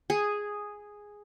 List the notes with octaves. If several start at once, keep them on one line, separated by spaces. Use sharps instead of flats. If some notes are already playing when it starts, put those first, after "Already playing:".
G#4